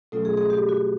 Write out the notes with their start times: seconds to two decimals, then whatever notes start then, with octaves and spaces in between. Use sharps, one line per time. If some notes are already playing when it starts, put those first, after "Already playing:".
0.12 B2 F#3 A3 C#4 F4 A4
0.25 G#4
0.37 G#4
0.50 G4
0.69 F#4